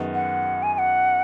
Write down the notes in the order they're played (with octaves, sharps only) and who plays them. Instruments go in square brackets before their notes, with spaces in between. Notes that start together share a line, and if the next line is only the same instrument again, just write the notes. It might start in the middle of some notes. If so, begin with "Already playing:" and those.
Already playing: [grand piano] F#2 D#3 G#3 B3
[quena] F#5
G#5
G#5
F#5